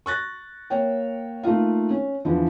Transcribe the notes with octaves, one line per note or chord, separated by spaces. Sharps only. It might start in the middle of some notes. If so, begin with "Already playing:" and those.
C#6 F#6 A6 A#6
A#3 C#5 G5
A3 A#3 D#4 F4 F5
C#4
E2 D3 E3 F3